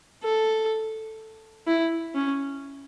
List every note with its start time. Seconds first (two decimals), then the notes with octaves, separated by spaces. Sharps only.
0.24 A4
1.67 E4
2.15 C#4